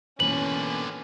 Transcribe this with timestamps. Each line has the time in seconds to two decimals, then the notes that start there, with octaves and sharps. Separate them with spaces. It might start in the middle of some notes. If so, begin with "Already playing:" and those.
0.20 B2 D3 E3 A#3 C#4 B4 F#7